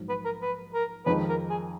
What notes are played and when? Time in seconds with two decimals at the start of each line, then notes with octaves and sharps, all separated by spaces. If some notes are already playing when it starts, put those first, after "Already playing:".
Already playing: A#1 G#2 F#3
0.09 B4
0.25 A#4
0.42 B4
0.74 A#4
1.06 F2 D#3 G#3 D#4 B4
1.29 A#4
1.50 G#4